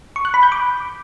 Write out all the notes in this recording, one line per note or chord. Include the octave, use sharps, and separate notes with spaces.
C#6
F#6
B5
G6
D6